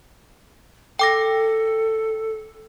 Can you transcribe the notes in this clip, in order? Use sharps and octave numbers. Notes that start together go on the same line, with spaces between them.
A4 G5 D6 A#6